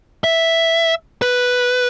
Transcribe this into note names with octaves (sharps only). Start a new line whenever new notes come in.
E5
B4